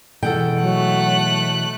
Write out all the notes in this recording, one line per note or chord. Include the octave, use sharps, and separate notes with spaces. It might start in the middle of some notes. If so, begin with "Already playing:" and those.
B2 E3 G#3 A4 F#5 G5
F#3 A3 F#6